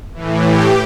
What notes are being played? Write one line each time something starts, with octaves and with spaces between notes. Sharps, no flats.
A2 E3
G4